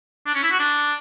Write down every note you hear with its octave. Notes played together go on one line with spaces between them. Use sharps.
D4
C#4
E4
F#4
D4